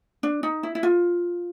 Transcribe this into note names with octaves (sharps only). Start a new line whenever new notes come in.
D4
D#4
E4
E4
F4